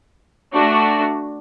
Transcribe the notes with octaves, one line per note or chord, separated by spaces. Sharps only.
A3 D4 F#4